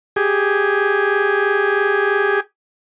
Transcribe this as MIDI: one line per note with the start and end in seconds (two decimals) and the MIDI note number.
0.16 2.40 67
0.16 2.40 68